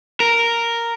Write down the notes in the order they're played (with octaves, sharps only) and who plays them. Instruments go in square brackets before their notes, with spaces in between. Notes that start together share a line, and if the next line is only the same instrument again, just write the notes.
[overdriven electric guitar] A#4